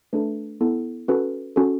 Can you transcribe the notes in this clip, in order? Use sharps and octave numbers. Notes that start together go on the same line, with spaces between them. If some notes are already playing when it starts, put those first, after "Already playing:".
A3 D4 A4 B4
B3 E4 A4
C#4 F#4 A4 B4
C#4 F#4 A4